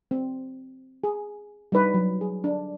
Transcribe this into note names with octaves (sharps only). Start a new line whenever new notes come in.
C4
G#4
G3 D4 D#4 B4
F#3
G#4
D4